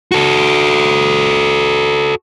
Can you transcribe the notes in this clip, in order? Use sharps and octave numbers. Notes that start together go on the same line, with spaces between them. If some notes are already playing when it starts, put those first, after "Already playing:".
F#4 A4